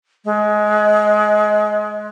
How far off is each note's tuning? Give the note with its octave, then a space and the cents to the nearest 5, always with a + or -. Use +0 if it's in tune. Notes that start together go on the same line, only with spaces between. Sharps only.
G#3 +25